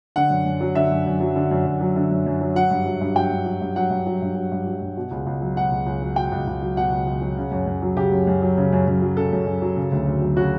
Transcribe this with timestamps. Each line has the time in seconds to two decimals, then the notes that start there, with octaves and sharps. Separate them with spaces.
0.16 D3 F#5
0.30 F#2
0.45 F#2
0.61 F#3
0.75 D3 E5
0.91 F#2
1.06 F#2
1.20 F#3
1.36 D3
1.51 F#2
1.66 F#2
1.81 F#3
1.96 D3
2.11 F#2
2.26 F#2
2.41 F#3
2.56 F#3 F#5
2.70 G2
2.86 F#3
3.01 G2
3.15 F#3 G5
3.31 G2
3.46 F#3
3.61 G2
3.76 F#3 F#5
3.91 G2
4.06 F#3
4.22 G2
4.36 F#3
4.51 G2
4.67 F#3
4.81 G2
4.97 B2
5.11 C#2
5.26 C#2
5.41 F#3
5.56 B2 F#5
5.71 C#2
5.86 C#2
6.02 F#3
6.16 B2 G5
6.31 C#2
6.47 C#2
6.62 F#3
6.77 B2 F#5
6.92 C#2
7.07 C#2
7.22 F#3
7.37 C#3
7.51 F#2
7.66 F#2
7.82 F#3
7.97 C#3 G4
8.12 F#2
8.27 F#2
8.42 F#3
8.57 C#3
8.73 F#2
8.88 F#2
9.02 F#3
9.17 C#3 A4
9.33 F#2
9.47 F#2
9.62 F#3
9.76 C#3
9.92 D2
10.07 D2
10.22 F#3
10.37 C#3 F#4